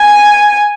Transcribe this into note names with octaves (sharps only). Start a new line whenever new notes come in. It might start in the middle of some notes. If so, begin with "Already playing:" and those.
Already playing: G#5